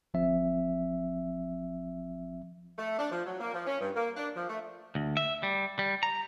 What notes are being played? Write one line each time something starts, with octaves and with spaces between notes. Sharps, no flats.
G1 F3 C4 E5
A3
D4
F3
F#3
A#3
F3
C#4
G2
A#3
D4
F3
A3
D2
E5
G3
G3
A#5